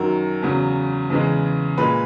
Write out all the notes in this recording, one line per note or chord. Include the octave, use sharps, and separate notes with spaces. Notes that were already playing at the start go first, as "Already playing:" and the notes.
Already playing: F#2 D#3 F#3 A#4
E2 C#3 F#3
E2 C#3 E3 G#3
A#2 G#3 B4